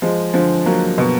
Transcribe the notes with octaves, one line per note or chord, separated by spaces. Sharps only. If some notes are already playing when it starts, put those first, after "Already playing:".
F3 G#3
D3 F3
F#3 A#3
B2